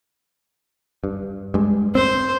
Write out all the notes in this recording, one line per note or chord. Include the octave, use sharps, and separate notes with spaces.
G2
G2 G#3
C4 C5